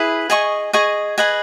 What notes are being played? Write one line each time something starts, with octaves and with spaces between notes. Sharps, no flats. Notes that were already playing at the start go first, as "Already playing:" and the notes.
Already playing: E4 G#4 B4
G#4 D#5 G#5 C#6
G#4 D#5 G#5 C#6
G#4 B4 D#5 G#5